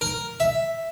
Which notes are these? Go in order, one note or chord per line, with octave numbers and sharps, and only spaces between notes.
A#4
E5